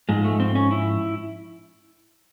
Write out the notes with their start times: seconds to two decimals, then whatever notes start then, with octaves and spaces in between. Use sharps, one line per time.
0.09 G#2 F3 G#3
0.24 A3
0.40 C4
0.55 C#4
0.71 E4